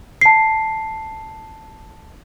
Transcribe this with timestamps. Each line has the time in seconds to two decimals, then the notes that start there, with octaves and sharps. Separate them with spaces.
0.21 A5 C7